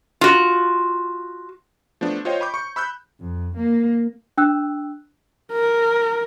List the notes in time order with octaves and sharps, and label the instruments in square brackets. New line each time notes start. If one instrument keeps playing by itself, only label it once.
[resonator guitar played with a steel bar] F4 F#4
[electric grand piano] F3 A3 B3 D4
F4 C5 C#5 D#5 G5
B5 C#6 D6 G6
C#6 C#7
B5 E6 F#6 G6
[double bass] F2
A#3
[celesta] D4 G5 E6 F#6
[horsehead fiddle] A#4